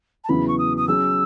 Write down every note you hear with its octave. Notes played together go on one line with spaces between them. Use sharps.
A5
E2 C#3 F#3 B3 E4 B5
C#6
D#6
D#6
F#3 C#4 G#4 E6